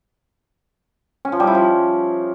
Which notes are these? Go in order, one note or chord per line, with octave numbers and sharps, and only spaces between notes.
C#4
F3
G3
E4
F3